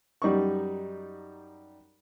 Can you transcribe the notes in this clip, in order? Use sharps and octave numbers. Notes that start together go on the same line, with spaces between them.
F#2 G3 D#4 C#6